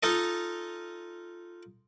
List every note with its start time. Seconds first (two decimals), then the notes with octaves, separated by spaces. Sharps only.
0.03 D#4 F4 A4 D#5